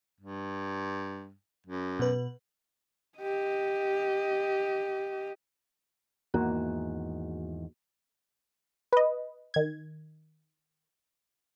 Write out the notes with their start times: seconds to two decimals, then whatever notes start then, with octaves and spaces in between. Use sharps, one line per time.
0.21 G2
1.67 F#2
1.99 B2 B4
3.19 G4 D#5
6.34 E2 G#2 D#3 A#3 F#4
8.93 B4 D#5
9.54 D#3 G#6